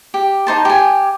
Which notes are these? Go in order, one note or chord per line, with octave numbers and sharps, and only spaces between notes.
G4
D#4 C5 A5
G4 G#5